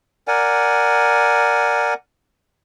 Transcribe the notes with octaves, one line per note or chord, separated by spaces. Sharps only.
A#4 D5 F#5 G#5